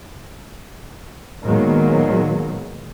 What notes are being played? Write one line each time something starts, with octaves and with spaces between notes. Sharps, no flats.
A#2 D#3 F#3 G#3 A#3 B3